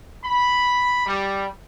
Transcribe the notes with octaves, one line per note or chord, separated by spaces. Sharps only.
B5
G3